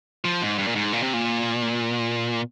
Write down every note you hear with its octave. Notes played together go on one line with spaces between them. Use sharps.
F3
G#2
G2
A#2
G#2
A#2
C3
A#2